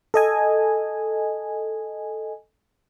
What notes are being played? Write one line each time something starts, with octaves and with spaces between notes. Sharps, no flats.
A4 D#5 G#5